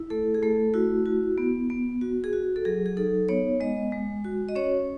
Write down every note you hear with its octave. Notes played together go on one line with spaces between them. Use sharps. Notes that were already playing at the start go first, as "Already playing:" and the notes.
Already playing: E4
A3 A4
G#4
A3 A4
E4 F#4
F#4
B3
B3
F#4
G#4
F#4
A4
F#3 G#4
G#4
D#4 A4
B3 C#5
G#3 D#5
G#3
F#4
D#5
C#4 C#5